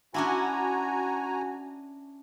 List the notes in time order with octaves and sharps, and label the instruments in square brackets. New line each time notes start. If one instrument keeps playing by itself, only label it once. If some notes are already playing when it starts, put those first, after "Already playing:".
[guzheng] C#4 D4 E4 [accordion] F#4 G#5 A#5